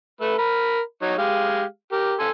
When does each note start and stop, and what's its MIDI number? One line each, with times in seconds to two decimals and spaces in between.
0.21 0.34 57
0.21 0.34 69
0.21 0.34 71
0.38 0.79 70
0.38 0.79 83
1.02 1.16 54
1.02 1.16 63
1.02 1.16 73
1.18 1.63 56
1.18 1.63 67
1.18 1.63 77
1.92 2.14 67
1.92 2.14 70
2.20 2.29 69
2.20 2.29 80
2.20 2.29 84